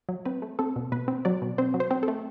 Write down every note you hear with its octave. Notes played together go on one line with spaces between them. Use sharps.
F#3
C4 B4
A3
C4 A4
B2
B2 B4
C4
F#3 D5
B2
C4 C5
F#3
C5
C4
A4
A3